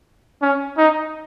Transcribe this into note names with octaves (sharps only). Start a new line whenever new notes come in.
C#4
D#4